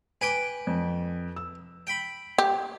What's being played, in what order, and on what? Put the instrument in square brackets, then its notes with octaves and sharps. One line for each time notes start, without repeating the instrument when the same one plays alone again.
[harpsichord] B4 G5 D6 [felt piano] G#5
[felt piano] F2
E6
[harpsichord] G5 B5
[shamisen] G4